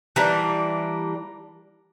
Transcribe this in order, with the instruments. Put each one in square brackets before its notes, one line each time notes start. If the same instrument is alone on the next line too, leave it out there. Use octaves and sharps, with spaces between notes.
[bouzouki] E3 G3 A#3 D4